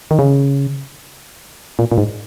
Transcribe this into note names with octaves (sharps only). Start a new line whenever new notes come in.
D#3
C#3
A#2
A#2
G#2